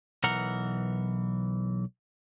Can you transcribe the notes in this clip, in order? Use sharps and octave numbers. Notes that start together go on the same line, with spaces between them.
B1 E3 A#4 F#5